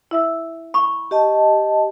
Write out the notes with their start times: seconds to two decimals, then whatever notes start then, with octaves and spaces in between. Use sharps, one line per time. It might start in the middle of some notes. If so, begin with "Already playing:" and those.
0.11 E4 E5 E6
0.74 B5 C#6
1.11 G4 D#5 A5